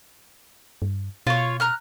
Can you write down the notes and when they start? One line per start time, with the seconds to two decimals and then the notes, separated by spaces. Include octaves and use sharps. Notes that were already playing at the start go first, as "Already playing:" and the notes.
0.82 G2
1.27 B2 F4 C#5
1.60 A#5 F6 F#6